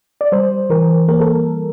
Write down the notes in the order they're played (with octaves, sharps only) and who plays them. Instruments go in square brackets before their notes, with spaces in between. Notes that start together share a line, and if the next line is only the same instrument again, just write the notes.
[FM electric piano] D5
G3 C5
E3 A#4
A#3 A#4
A4